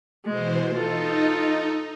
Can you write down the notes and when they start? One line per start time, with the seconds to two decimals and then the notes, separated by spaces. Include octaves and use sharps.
0.25 B2 E3 G#3 C5
0.74 D#4 F4 A4